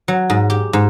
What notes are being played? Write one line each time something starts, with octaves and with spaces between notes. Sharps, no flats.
F#3
G#2
G4
G#2